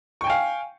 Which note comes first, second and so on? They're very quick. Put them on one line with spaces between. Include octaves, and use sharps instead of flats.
C#6 G5 G#5 F5